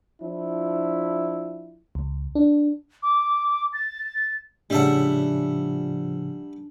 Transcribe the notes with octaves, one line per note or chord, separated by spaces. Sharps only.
F3 D4 E4
C#2
D4
D6
A6
A2 C#3 F3 G3 D4 E5 F#5 A5